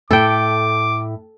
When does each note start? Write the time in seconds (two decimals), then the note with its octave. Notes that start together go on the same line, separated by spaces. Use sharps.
0.11 A2 E4 A4 G5 D6